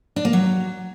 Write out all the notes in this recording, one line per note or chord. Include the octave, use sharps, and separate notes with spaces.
D4
A#3
F#3